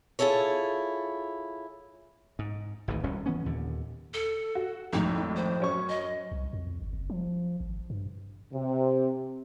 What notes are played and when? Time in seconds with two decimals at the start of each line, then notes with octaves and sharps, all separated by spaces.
0.19 E4 F4 G#4 A4 C#5
2.39 G#2
2.88 G#1 D2 G#2 E3
3.03 D#1 C2 C#4
3.26 E3 B3 C#4
3.46 D#2 A#2 D3
4.14 A4
4.55 F#4
4.93 G#1 F2 A2 D#4
5.36 C5
5.60 F#2 C#4 C#6
5.89 D#5
6.32 C2
6.53 F2
6.82 G1
6.93 F#1
7.10 F3
7.60 G#1
7.90 G2
8.52 C3